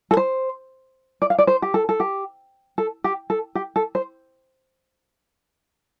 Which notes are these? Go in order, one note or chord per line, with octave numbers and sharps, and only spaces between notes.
A4
C5
D5
F5
D5
C5
G4
A4
A4
G4
A4
G4
A4
G4
A4
C5